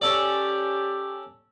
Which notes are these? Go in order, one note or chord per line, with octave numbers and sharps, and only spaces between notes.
C#4 G4 A4 D5